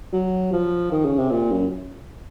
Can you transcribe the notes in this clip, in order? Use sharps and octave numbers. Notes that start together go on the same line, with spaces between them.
F#3
F3
D#3
C#3
C3
A#2
F#2